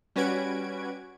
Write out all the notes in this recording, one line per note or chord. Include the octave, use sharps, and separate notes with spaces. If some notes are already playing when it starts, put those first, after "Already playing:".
G3 C#4 F#4 B4 G#6 D7